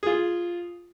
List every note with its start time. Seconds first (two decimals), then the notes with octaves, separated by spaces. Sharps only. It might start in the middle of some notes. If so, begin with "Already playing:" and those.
0.03 F4 G#4